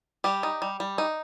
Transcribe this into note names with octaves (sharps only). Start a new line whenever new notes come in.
G3 G4
D#4
G3
G3
D#4